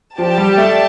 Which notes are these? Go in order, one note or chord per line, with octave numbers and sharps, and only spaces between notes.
F3 G4 D5 A5
G3
A3